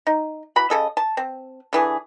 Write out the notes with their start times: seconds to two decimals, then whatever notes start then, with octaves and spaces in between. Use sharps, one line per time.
0.07 D#4
0.56 E3 F#4 B5
0.70 C#3 A4 D#5
0.97 A5
1.17 C4
1.73 D3 E3 G#4